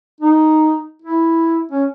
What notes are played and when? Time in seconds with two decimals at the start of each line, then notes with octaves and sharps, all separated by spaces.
0.20 D#4
1.02 E4
1.71 C#4